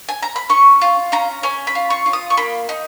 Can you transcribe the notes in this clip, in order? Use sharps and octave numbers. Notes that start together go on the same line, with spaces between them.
G#5
A#5
B5
C#4 C#6
F4
C#4 A#5
C#4 G#5
B5
F4
C#6
F4
D#6
C#6
A#3 B5
D#4